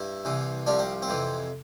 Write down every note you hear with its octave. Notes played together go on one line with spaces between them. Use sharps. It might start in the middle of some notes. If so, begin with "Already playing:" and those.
Already playing: G2 E4
C2 C3 E3
C2 C3 F3 D4
C4
C4
F2 C3 E3